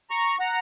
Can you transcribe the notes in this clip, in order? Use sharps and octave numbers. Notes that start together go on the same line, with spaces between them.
A#5 C#6
F#5 A#5